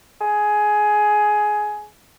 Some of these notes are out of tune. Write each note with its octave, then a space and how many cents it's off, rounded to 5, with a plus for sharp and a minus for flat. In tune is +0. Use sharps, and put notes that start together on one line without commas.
G#4 +15